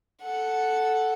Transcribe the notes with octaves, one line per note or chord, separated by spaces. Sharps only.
A4 F#5